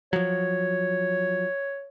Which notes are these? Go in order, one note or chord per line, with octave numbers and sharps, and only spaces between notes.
F3 F#3 C#5